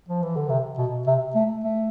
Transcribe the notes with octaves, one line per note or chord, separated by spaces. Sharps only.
F3
E3
D3
C3
B2
C3
A3
A3